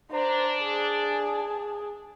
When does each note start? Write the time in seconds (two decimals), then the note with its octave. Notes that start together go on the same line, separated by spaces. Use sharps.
0.12 D4 C5 A#5
0.61 G#4 A5